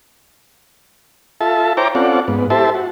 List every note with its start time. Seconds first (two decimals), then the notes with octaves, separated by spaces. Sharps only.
1.41 F4 A4 E5 A5
1.77 E4 C5 C#5 G5 A#5 D6
1.95 C4 C#4 F4 A4 D5 F#5
2.28 G#2 B3
2.50 E4 G4 A4 C5 E5 A5
2.75 F#4